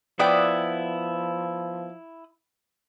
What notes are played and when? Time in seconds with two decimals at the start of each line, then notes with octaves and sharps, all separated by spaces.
0.19 F3 B3 E4 D5 G5 D#6 F#6